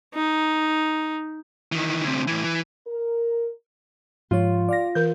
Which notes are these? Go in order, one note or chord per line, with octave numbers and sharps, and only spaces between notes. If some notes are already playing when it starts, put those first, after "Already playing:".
D#4
D#3 E3
D2 C3
A2 E3
E3
A#4
G#2 F3 F4 C#5
D5 F5 A#6
E3 A#4 G6